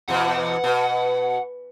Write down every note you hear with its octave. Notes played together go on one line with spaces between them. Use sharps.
E2 B2 F#5
B2